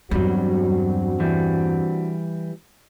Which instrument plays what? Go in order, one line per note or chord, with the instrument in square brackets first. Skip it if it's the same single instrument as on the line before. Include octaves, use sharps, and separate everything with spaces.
[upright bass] E2 G2 [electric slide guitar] F#3 G3 [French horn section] C4 D4 F#4
[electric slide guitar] E3 G3